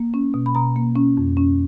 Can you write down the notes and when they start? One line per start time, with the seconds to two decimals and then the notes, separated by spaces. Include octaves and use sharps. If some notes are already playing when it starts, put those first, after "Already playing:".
Already playing: A#3
0.14 C#4
0.34 B2
0.46 B5
0.55 B2 A#5
0.76 A#3
0.96 C#4
1.17 F2
1.37 C#4